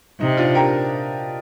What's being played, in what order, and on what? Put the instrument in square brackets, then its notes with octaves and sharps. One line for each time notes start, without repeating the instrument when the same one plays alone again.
[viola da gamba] C3 [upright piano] D#4
[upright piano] D4 F4
G4 A#4